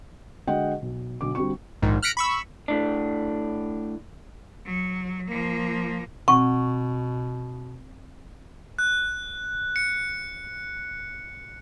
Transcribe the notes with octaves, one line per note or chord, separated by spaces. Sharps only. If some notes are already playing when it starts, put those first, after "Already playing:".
D3 G#3 F#4 D#5 F#5 G5
B1
B1 D3 D6
D3 G3 C4 F#4 C#6
A#1 G#2 D#3
F6 F#6 A#6 B6 C#7 D7
B5 C#6 E6
A2 D4
F#3
F3 A#3
B2 C4 F#5 C#6
F#6
C#7